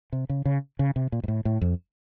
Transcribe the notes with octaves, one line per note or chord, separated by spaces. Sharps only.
C3
C#3
C#3
C#3
C3
A#2
G#2
A2
A2
F2